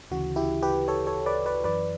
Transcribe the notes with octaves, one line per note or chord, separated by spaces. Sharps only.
D2 C#3 E3 F#4
E4 G4
G4 B4
A4 C#5
A4 C#5
B4 D5
B4 D5
F#2 E3 B4 D5